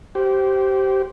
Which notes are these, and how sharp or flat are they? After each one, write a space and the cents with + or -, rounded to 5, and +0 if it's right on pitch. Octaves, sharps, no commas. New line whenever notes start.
G4 -20 C5 +0